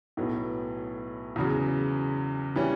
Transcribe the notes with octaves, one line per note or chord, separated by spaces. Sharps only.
B1 A2 F#3 B3
E2 C#3 F#3
E3 G3 C#4